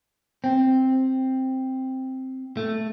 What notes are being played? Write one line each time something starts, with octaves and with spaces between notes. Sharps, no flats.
C4
A3